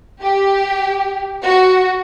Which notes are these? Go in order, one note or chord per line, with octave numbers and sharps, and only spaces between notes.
G4
F#4